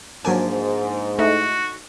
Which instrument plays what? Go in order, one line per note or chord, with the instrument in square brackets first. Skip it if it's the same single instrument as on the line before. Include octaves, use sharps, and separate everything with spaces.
[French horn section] G#2 [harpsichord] F3 A#3 D4 [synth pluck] F#3 G#5
[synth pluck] A3 D#4 E4 [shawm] F#4